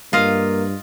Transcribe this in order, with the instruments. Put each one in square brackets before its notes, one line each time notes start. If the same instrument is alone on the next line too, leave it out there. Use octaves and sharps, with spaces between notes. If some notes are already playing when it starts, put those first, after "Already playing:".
[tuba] G2 [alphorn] A#3 [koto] F4 D#5 F5